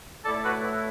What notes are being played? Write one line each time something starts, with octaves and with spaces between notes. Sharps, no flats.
A2 A3 E4 A4 D5
F#4 B4
A4